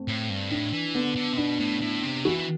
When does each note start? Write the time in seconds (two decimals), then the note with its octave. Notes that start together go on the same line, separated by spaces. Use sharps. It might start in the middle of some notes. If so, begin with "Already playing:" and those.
Already playing: A3 C4
0.08 A2
0.30 G2
0.50 A2 D4
0.73 E3
0.95 D3 B3
1.16 D3
1.33 C3
1.37 B2 D4
1.59 A2
1.82 A2
2.03 C3
2.25 E3 F#4